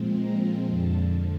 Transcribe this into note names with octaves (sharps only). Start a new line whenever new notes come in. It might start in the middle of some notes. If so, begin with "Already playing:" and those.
Already playing: A#2 F3 G#3 C4
A#5
F2 D3 F3 A5